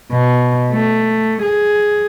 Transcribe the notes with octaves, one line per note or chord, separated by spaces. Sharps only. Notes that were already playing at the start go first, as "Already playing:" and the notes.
B2
A3
G#4